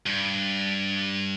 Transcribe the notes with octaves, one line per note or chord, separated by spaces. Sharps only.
G2